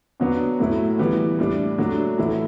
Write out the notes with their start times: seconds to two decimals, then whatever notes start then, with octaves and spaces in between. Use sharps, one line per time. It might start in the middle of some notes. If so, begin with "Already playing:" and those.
0.20 B2 F#3 B3 D4
0.59 A2 F#3 A3 E4
0.99 E3 G3 B3
1.39 A2 G3 D4
1.78 F#3 A3 D4
2.18 A2 E3 A3 E4